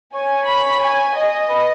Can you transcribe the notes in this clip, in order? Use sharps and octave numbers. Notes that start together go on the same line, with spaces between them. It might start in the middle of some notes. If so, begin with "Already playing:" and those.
C#5 G#5
B5
G#5
D#5
B4